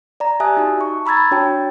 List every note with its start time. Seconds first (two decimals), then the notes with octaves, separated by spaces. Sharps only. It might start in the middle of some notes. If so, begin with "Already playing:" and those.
0.20 D5 A#5
0.40 G4 E5 G#5 A5 D#6 F#6
0.57 D#4 F#4 A5
0.81 C#6
1.06 A#5 B5 E6 G#6 A6
1.31 D4 F#4 C#5 G5 A5